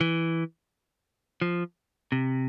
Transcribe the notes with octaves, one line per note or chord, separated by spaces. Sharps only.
E3
F3
C3